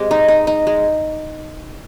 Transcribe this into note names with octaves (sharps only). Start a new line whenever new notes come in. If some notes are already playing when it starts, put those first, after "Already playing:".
Already playing: G#3 C4 G4
D#4
D#4
D#4
G#3